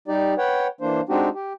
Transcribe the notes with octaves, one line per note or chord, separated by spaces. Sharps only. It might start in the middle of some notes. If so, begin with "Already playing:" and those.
G3 D#4 G4 D5
B4 C#5 F#5 G5
E3 A#3 D4 C5
G#3 C4 D4 D#4 F#4 G4
G4